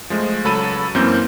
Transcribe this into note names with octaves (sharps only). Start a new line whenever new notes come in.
F3 G#3 A3
C#2 F#3 A4 B5 A6 D#7
F#2 E3 A#3 C4 C6 G6